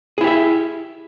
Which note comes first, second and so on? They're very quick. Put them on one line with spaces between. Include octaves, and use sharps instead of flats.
G#4 E4 G4 E5